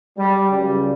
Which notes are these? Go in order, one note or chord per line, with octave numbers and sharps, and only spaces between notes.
G3
C#2 C#3 F#3 G3